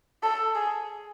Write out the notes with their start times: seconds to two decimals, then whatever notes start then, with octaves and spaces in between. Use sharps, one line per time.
0.23 A4
0.55 G#4